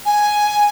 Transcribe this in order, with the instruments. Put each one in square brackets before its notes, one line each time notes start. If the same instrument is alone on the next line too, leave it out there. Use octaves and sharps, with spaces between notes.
[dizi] G#5